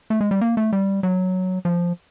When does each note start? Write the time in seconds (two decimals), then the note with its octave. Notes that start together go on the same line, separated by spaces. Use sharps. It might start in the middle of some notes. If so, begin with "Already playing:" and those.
0.10 A3
0.21 G#3
0.31 G3
0.41 A#3
0.57 A3
0.72 G3
1.03 F#3
1.65 F3